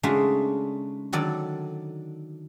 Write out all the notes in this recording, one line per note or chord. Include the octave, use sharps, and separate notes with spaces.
C#3 G#3 A3 D4 D#4 F#4
D3 D#3 F#3 A4 D5